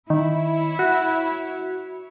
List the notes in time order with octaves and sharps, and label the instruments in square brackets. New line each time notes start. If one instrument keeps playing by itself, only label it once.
[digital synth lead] D#3 [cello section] E4 C#5
[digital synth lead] F#4